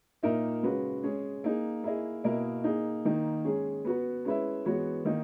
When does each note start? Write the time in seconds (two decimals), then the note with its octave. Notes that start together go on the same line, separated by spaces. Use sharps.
0.23 A#2 A#3 D#4 A#4 E5
0.63 C#3 G#3 C#4 F#4 B4
1.04 G#3 C#4 G#4
1.44 A#3 D#4 G#4
1.84 A#3 E4 G#4 D#5
2.24 B2 A#3 E4 A#4 D#5
2.64 A#3 D#4 G#4
3.05 D#3 A#3 D#4
3.45 G#3 C#4 G#4
3.85 B3 F#4 B4
4.25 G#3 C#4 E4 B4 E5
4.65 E3 G#3 B3 F#4 C#5
5.05 D#3 A#3 D#4